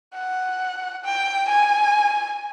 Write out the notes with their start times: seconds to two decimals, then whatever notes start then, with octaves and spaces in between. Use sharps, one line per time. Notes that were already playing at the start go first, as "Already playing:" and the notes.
0.15 F#5
1.04 G5
1.49 G#5